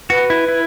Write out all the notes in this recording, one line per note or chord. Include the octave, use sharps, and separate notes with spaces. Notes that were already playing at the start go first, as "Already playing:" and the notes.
F#4 B4
E4
E4